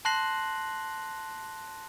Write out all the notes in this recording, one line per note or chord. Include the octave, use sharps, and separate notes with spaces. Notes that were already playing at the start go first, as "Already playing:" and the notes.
A5 C6 F#6 A#6 C7 F#7